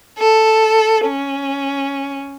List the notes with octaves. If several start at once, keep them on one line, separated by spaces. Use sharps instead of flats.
A4
C#4